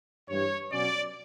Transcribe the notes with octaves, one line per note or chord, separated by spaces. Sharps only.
G2 E3 G3 C#5
B2 F#3 C#4 D5